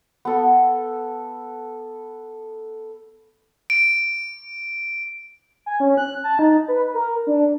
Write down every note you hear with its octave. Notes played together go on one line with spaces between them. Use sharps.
B3 A4
D7
G#5
C#4
F#6
A5
D#4
B4
A#4
D4